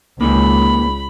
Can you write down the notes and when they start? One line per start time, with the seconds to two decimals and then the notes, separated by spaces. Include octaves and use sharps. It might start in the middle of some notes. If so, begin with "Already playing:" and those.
0.21 C#2 A#3 D#4 G#4 B5